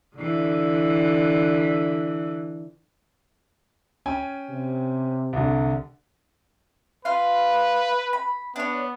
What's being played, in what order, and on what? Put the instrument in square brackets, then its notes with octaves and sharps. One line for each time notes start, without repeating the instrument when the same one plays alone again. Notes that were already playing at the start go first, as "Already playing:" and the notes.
[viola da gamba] D3 E3
[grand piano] C#4 G5 G#5
[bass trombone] C3
[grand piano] C2 D3
[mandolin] F4 F5 [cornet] B4
[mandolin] B5
[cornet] B3 [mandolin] D4 C#5